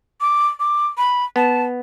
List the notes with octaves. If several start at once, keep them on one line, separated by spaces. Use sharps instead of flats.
D6
D6
B5
B3 A5